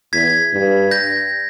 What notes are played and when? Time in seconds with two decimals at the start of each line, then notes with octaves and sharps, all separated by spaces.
0.13 E2 G#6 B6
0.53 G2
0.91 G6 A#6